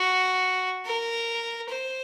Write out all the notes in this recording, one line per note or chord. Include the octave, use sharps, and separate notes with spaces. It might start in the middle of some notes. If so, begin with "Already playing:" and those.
Already playing: F#4
A#4
C5